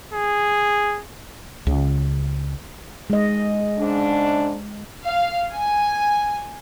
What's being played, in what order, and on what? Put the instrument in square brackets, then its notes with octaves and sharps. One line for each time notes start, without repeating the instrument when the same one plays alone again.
[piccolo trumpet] G#4
[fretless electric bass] C#2 C#3
[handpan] G#3 D#5
[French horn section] G#2 C#3 D4
[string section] F5
G#5